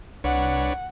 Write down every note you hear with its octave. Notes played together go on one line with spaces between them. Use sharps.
C2 D4 B4 C#5 F#5